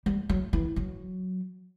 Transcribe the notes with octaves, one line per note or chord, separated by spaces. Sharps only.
G3
F#3
E3
F#3